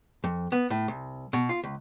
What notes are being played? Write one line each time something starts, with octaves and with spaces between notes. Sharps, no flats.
F2
B3
A2
C2
B2
F4
C#2